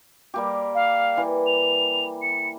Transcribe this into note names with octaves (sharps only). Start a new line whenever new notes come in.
G3 A#3 G4
F5
E3
F7
C#7